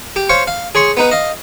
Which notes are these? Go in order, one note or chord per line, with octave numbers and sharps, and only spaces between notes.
G4
C5 C#5 F5 C#6
F5
G#4 C#5 C6 C#6
B3 D#4 B4
D#5 F5